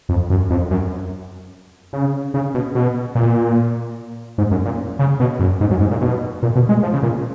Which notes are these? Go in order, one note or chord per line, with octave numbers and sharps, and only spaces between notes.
F2
F#2
F2
F#2
C#3
C#3
B2
B2
A#2
G#2
F#2
A#2
C#3
B2
F#2
G#2
F#2
G#2
A#2
B2
A#2
B2
G#3
F3
C#3
A#2